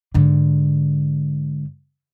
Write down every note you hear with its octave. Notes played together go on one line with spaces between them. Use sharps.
G#2 D3